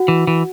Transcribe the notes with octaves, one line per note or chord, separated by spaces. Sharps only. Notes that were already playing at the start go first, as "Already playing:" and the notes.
Already playing: F#4 F#5
E3
E3